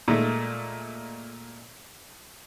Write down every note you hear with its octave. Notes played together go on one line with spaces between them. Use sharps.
A#2 G#3 A3